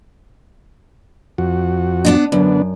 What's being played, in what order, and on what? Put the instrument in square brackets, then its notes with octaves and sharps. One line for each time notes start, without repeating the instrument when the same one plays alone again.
[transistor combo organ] F2 F#4
[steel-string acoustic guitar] B3 D4 D#4
[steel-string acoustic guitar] F#2 [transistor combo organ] D3 B3 D4